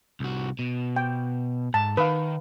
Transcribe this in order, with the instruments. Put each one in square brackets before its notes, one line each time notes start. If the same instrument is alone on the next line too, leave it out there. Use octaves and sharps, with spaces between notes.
[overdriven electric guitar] C2 F#4
B2
[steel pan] G5
[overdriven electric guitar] G#2 [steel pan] A5
[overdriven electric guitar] D#3 [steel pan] B4 F5